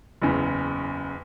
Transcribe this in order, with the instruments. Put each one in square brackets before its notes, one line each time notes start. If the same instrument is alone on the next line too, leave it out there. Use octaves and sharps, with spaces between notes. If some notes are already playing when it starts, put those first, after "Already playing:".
[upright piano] F#1 E2 C#3